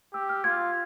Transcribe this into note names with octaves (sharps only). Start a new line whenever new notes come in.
G4 E6
F6
F4 G#6